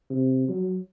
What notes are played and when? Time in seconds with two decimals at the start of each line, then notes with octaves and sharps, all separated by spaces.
0.10 C3
0.49 F#3